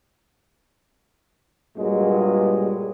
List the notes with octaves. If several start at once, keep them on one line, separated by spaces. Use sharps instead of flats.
G2 A#2 F#3 G#3